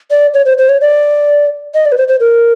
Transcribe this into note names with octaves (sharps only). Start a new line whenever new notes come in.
D5
C#5
C5
C5
C#5
D5
D#5
D5
B4
C5
C5
A#4